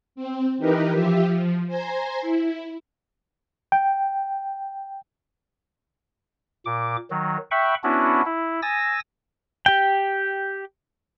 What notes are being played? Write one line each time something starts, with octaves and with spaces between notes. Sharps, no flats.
C4
E3 D#4 G4 A#4 B4
F3 F4 G4 E5
F3
C5 G#5 A#5 C6
E4
G5
A#2 D6
D#3 F#3
E5 F#5 G5 B5 C#6
B3 C#4 D4 E4 F#4
E4
G#5 D#6 E6 A6 A#6
G4 G5